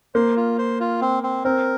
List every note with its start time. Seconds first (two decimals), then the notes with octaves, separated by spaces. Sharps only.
0.15 A#3 C5
0.37 F4
0.58 C5
0.80 F4
1.01 C4
1.23 C4
1.45 C4 A#4